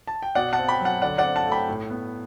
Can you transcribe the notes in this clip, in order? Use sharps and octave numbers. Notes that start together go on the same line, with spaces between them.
A5
G5
B2 D5 F#5
F#5 A5
C4
G5 B5
F#3
F#5 A5
D3 D5 F#5
D5 F#5
C4
F#5 A5
A3
G5 B5
A2
B3